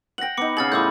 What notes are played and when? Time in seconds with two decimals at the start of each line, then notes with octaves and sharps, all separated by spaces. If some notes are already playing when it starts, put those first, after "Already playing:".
0.18 F#5 G5 A#6 F#7
0.37 B3 D#4 D6 C#7
0.57 C#3 G#4 F6 A6 F#7
0.72 A2 F4 B5 D6 E6 G6